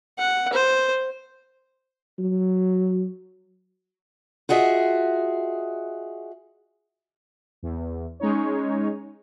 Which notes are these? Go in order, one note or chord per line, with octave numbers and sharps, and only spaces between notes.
F#5
C5
F#3
F4 F#4 G#4 D#5 E5
E2
G#3 C#4 D#4 C#5